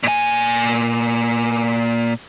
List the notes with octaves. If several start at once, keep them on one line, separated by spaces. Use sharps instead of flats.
A#2 G#5